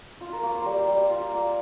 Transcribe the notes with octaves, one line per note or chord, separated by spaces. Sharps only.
F4
A#4
A#3 C#5
C5
G3 A#4
G3
F4
A#3